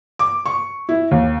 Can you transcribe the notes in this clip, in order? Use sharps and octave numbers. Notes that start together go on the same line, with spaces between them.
D6
C#6
E4
D#2